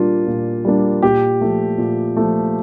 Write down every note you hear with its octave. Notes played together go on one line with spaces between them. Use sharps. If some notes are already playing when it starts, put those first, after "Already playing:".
Already playing: A#2 G3 A#3 D4 F4
A#2
G3 A#3 D4
A#2 G4
F3 A3
A#2
F3 A3